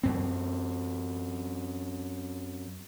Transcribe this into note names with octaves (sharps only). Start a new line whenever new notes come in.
F#2 C4